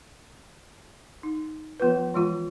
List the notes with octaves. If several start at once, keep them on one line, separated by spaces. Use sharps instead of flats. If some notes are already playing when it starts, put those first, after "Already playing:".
D#4
F3 B3 F4 B4
E3 G#3 F4